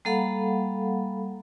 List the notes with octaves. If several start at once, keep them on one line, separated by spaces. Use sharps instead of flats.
G3 A#3 A4 F5 F#5 B5